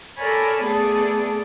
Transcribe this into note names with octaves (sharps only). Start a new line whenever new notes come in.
A4 A#4 C#5 D5 G#5 B5
A3 B3 G#4 A4 D5